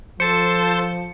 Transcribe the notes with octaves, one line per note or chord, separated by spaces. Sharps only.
F3 A4 C5 A5 C6 C#7